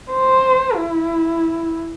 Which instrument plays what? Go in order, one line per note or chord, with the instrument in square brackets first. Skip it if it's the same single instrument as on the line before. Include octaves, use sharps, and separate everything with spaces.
[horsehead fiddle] C5
E4